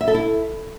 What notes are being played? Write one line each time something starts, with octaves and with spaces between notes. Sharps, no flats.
E5
A4
E4